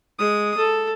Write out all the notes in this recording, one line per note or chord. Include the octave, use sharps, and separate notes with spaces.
G#3 D#6
A4